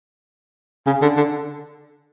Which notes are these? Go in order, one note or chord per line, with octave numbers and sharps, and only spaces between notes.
C#3
D3
D3